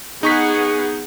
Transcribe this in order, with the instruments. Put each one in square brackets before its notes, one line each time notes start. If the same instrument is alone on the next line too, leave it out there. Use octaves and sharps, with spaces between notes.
[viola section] B3 G#4 F#5 [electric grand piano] D#4 C#6 B6